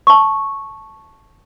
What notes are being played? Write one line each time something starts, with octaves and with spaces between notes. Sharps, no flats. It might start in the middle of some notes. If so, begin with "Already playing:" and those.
A5 C#6